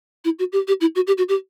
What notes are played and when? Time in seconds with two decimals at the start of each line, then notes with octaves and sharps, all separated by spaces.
0.25 E4
0.39 F#4
0.52 G4
0.68 G4
0.81 E4
0.96 F#4
1.07 G4
1.18 F#4
1.29 G4